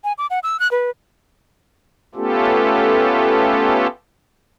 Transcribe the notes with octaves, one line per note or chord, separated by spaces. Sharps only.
G#5
D6
F#5
E6
F#6
B4
A3 B3 C#4 F4 G4 A4